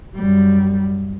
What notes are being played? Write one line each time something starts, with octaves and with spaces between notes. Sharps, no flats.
F#2 G3